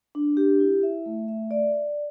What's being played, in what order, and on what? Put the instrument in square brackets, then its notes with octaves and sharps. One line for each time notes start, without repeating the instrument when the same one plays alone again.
[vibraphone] D4
G4
E4
E5
A3
E5
D5
D5